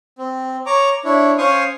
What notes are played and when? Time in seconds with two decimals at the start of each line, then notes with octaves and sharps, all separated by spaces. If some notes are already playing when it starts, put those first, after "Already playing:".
0.18 C4
0.66 C#5 A#5 D6
1.04 D4 E4 C#5
1.38 C#4 C5 C#5 F5 C#6 D#6